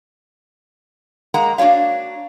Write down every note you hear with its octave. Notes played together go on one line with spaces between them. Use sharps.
G#3 A#3 F#5 A#5
A#3 D4 F#4 C#5 F5